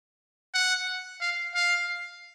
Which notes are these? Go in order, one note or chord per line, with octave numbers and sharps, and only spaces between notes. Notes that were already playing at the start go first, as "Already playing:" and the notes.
F#5
F5
F5